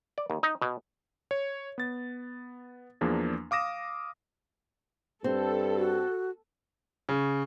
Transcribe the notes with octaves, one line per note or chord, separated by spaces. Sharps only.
D5
D#2
D#4
B2
C#5
B3 A6
E2 F3 A#3 D4 G#4
F5 D6 D#6 A#6 E7
G2 C4 A4
F#4
C#3